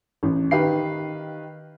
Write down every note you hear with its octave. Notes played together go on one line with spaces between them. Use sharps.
A1
D#3 G4 B4 F5 C7